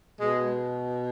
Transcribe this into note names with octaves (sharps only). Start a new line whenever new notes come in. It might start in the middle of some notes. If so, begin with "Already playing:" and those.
B2 G#3